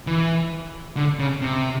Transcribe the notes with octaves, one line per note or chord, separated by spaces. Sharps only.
E3
D3
C#3
C3